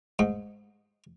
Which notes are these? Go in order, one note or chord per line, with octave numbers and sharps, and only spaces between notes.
G#2